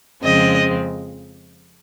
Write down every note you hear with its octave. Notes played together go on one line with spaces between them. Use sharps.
F2 C#3 F3 G#3 C4 D#5